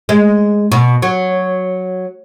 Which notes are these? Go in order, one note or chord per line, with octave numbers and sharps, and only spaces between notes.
G#3
B2
F#3